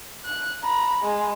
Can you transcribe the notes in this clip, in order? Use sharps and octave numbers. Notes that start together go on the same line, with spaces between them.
F#6
A#5 B5
G#3